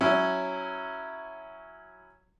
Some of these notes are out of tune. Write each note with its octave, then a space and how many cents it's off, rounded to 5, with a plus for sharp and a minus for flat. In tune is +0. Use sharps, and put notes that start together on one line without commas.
F#3 +0 C#4 +0 E4 +0